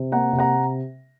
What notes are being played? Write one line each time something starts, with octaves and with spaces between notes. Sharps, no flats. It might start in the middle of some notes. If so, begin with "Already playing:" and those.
Already playing: C3
A#3 F#5 A#5
C3
F#5 A#5